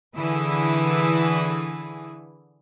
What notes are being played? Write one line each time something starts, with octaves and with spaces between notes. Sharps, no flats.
D3 E3 E4 G#4 B4